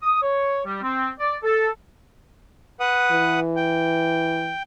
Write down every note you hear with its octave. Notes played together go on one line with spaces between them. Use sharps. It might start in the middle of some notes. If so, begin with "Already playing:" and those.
D#6
C#5
G3
C4
D5
A4
B4 F#5 D#6
E3
G5